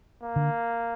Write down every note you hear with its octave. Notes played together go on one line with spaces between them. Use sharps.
A#3
D3